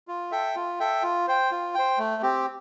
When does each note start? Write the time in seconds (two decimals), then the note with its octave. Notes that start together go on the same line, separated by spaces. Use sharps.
0.08 F4
0.31 A4 E5 G5
0.55 F4
0.80 A4 E5 G5
1.02 F4
1.27 C5 G5
1.51 F4
1.75 C5 G5
1.98 A3
2.22 C4 G4